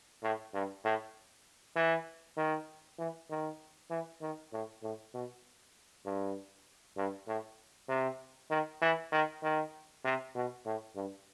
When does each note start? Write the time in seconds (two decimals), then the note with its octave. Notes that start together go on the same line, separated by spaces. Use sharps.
0.23 A2
0.54 G2
0.85 A2
1.76 E3
2.37 D#3
2.99 E3
3.30 D#3
3.91 E3
4.21 D#3
4.53 A2
4.83 A2
5.14 B2
6.06 G2
6.97 G2
7.28 A2
7.89 C3
8.50 D#3
8.82 E3
9.12 D#3
9.43 D#3
10.05 C3
10.35 B2
10.66 A2
10.96 G2